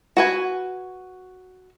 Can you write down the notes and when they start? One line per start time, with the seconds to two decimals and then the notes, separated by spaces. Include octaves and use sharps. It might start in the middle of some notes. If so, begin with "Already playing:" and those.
0.17 F#4 B4 G#5